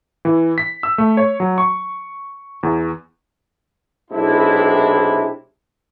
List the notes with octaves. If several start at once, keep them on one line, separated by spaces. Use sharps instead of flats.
E3
B6
E6
A3
C#5
F#3
C#6
E2
B1 C3 G#3 D4 E4